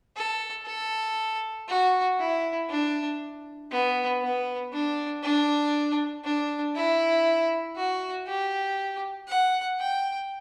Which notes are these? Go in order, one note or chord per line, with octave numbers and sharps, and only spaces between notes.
A4
A4
F#4
E4
D4
B3
B3
D4
D4
D4
E4
F#4
G4
F#5
G5